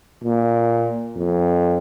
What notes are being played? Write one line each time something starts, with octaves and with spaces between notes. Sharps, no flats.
A#2
F2